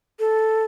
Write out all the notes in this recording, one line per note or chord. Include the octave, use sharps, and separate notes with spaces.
A4